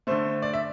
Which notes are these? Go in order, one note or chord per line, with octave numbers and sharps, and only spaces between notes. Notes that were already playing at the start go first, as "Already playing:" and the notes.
D3 A3 C5
D5
E5